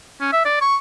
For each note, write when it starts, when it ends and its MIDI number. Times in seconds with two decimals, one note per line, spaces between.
0.21 0.30 61
0.32 0.41 76
0.45 0.59 74
0.61 0.76 85